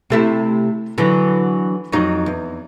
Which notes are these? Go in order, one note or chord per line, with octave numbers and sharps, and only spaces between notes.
C3 A3 E4
D3 E3 F#3
F2 F#3 D#4
E2